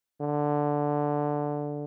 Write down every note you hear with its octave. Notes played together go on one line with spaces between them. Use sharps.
D3